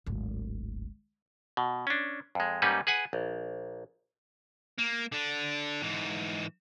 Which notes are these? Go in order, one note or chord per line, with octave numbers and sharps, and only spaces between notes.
D1 G#1
B2
C#4 D4
F2 G#3
G#2 G3 A#3 C#4 D#4 B4
G#4 B4 F#5 G#5
A#1
A#3
D3 D4
G#2 E3